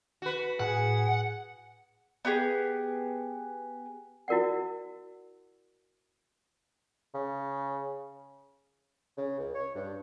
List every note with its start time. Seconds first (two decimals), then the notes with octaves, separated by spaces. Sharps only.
0.22 F#4 B4
0.60 A2 G#4 F#5
2.25 B3 G4 G#4
4.28 E4 F#4 A#4 D5 F#5
7.15 C#3
9.17 C#3
9.38 C#2
9.54 C#5
9.75 G2